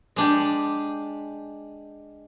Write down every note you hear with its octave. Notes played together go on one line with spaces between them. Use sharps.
G#3 D4 G4